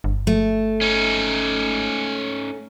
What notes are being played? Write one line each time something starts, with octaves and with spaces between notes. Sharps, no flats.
G1
A3
C#4 D#4